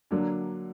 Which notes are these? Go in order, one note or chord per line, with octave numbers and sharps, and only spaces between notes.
D3 F#3 A#3 D4